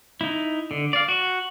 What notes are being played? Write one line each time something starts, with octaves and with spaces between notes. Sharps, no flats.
D#4 E4
D3
D5 F5
F#4